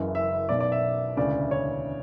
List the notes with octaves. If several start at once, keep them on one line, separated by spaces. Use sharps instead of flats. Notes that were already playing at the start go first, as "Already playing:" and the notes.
Already playing: F#1 F#2 C#3 E3
E5
B1 B2 D5
D5
E5
E1 D2 C#3 E3 D5
C#5